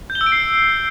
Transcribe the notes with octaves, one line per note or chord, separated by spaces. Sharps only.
G6
G7
E6
D7
C7